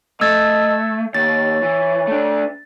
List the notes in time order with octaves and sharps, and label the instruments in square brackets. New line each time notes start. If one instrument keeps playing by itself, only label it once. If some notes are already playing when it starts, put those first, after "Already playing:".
[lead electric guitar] A3 [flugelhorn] D#5 [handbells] E6 G#6 A6
[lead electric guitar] D#2 [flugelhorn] C#5 [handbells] A6
[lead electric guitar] E3
A3 D4